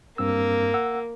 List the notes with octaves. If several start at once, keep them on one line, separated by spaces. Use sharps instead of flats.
G2 A#3 C4 E6
F#5 E6